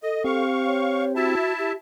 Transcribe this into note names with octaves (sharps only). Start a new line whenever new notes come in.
A4 D#5
C4 G4 F5 C#6
C#5
E4 F#4 E5 A5
G4